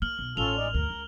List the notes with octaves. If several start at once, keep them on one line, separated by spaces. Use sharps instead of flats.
A#3 F6 F#7
B1
A1 C#4 F4 A4 F7 G7
G#3 D#4 D5
D2 G2 A#4
C#2